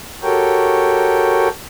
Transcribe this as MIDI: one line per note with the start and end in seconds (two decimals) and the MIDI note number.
0.23 1.49 66
0.23 1.49 67
0.23 1.49 69
0.23 1.49 70
0.23 1.49 73
0.23 1.49 79